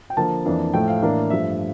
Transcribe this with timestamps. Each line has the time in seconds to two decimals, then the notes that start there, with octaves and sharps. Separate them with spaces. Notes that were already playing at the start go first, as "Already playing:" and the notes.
0.10 G5
0.17 D3 F3 A#3 A5
0.45 F2 E3 A#3 D4
0.74 A2 F3 A3 G5
0.88 F5
1.02 A2 E3 A#3 D4
1.30 G2 F3 A3 E5